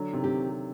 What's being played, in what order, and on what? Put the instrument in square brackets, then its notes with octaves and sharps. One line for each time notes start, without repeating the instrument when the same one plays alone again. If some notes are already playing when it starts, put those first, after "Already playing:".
Already playing: [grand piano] D3 F#3
C3 D#3
[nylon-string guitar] C4 G4